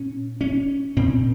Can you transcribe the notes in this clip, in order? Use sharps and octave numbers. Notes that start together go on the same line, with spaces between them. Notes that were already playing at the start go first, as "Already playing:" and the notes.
Already playing: A#2 C#4
C#4
A#2 C4